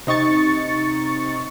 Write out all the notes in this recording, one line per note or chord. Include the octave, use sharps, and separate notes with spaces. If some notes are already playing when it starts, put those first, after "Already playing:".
C3 D#4 C#6 A6 C#7